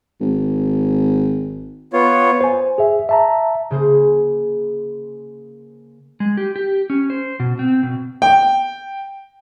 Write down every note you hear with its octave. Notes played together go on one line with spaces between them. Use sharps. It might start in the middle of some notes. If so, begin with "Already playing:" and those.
G#1
B3 F4 C#5
C5 G#5
G#4 E5
E5 A5 A#5
C#3 A#3 G#4 C5
G#3
G4
G4
C#4
C5
B2
C4
B2
G5